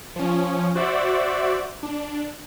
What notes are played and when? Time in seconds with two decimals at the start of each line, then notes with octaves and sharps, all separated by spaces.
0.16 F3 C#4
0.75 F#4 C5 D5 E5
1.83 D4